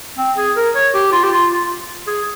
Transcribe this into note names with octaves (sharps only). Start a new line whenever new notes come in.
C4
G#4
A#4
C#5
G4
F4
G4
F4
F4
G#4